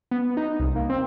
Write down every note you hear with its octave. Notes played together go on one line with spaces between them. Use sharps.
B3
D#4
C2
A#3
C4